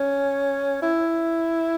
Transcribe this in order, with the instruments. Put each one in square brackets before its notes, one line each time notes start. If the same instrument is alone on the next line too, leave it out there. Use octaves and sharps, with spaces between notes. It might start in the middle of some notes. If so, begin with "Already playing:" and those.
Already playing: [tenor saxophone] C#4
E4